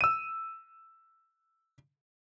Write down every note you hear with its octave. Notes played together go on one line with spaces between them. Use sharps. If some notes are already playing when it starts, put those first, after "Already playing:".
E6 D#7